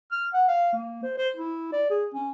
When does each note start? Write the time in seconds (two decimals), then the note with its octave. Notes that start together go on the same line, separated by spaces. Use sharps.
0.12 F6
0.34 F#5
0.49 F5
0.73 A#3
1.03 C5
1.18 C5
1.37 E4
1.73 D5
1.90 G#4
2.14 C#4